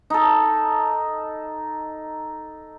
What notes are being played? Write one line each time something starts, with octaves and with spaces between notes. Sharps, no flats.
D#4 A4